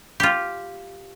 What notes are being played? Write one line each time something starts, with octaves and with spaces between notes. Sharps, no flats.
F4 G4